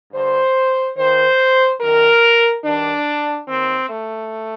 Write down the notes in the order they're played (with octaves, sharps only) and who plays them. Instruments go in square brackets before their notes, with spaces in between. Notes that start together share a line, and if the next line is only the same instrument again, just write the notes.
[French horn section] G2 D3 C5
D#2 D#3 C5
F#2 D#3 A#4
G2 D#3 D4
D#2 D#3 C4
A3